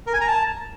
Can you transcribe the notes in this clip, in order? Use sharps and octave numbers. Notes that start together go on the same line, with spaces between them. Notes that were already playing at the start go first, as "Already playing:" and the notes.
A#4
G#5
A#5
A5